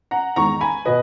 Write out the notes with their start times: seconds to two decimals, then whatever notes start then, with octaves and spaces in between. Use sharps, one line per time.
0.11 F#5 A#5
0.36 E2 D#3 G#3 A#5 C#6
0.61 G#5 B5
0.85 B2 B4 D#5